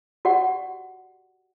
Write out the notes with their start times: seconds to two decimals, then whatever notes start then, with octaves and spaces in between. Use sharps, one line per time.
0.25 F#4 G4 D5 F#5